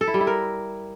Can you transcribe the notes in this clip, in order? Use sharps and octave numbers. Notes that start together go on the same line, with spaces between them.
A4
E4
G3
E4
A#4